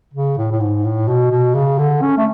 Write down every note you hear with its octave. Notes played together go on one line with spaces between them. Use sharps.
C#3
A2
A2
G#2
A2
B2
B2
C#3
D3
C#4
A3